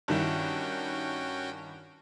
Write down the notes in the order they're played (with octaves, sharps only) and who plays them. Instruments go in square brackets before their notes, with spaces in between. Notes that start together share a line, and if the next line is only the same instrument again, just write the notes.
[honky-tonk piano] G2 D#3 E4 [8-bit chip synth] C#4 F#4 G5